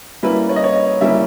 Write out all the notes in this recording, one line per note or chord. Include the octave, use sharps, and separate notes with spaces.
G3 A#3 C#4 E4 B4
C#5
D#5
C#5
D#5
G3 A#3 C#4 E4 E5